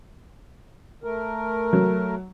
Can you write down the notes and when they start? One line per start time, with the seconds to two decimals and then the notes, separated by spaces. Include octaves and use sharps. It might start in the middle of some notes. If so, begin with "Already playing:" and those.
1.04 A3 A#4
1.73 F#3